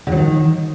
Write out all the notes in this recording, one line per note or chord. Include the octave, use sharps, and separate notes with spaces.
D3
F#3
D#3